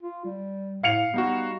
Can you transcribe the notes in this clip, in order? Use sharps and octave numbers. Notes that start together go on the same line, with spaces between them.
F4
G3
A2 F5 C#7 F7
G3 B3 D#4 F#4